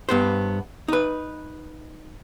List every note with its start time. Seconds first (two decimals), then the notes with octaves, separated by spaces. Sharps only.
0.09 G2 B3 C5
0.88 D#4 B4